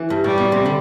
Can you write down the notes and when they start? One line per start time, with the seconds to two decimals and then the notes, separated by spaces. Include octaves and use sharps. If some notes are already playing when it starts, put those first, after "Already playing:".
Already playing: E3
0.10 G2
0.24 A2 G3
0.38 B2
0.52 C3
0.66 D3